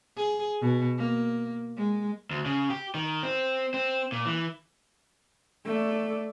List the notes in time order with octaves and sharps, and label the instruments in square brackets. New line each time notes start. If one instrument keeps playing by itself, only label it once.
[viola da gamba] G#4
B2
A#3
G#3
[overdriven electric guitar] D2
C#3
G4
D#3
C4
C4
A#2
E3
[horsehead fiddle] A3 D5